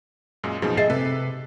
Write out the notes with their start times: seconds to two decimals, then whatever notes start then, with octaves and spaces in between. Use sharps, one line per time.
0.44 F#2 A#2 G#3
0.62 F#2 B2 F3 D#4 G#4
0.77 G#4 D#5 E5 A6 C7
0.90 C3 A4 B4